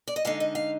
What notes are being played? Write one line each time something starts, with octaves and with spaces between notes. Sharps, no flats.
D5
D#5
D3 G#3 D#4 F5
D#5
F5